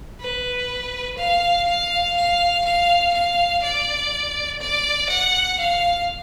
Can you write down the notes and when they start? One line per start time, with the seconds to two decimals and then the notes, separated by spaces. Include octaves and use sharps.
0.20 B4
1.17 F5
1.67 F5
2.16 F5
2.65 F5
3.13 F5
3.62 D5
4.60 D5
5.09 F#5
5.59 F5